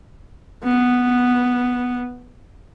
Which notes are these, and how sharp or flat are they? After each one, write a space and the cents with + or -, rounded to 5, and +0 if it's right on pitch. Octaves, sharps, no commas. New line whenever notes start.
B3 +0